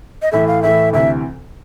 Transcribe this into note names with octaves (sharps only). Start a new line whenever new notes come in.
D#5
A2 E3 A3 E5
F5
A2 E3 A3 E5
D2 C3 E3 E5